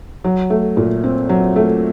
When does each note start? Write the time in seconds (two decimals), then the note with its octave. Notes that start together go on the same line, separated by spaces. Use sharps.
0.24 F#3
0.50 A3
0.77 A#2
1.04 C4
1.29 F#3
1.56 A3